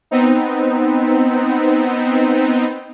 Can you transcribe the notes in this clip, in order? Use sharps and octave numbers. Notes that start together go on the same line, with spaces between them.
B3 C4 D#4